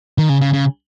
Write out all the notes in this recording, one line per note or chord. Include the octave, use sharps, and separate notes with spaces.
D#3
C#3
C#3
C#3